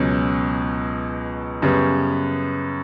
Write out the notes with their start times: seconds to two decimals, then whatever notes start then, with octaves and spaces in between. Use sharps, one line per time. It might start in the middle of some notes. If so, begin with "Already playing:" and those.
Already playing: C#2 B2 F#3 C#4
1.62 F#2 C#3 G3 B3